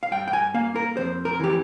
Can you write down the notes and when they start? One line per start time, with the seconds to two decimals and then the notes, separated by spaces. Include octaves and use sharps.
0.03 F5
0.11 G2 G5
0.28 G5
0.33 G#5
0.54 A#3 F5
0.76 A#4
0.97 F2 C5
1.25 A#4
1.40 E3 G4